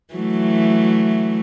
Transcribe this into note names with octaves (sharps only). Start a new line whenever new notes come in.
E3 F#3 A3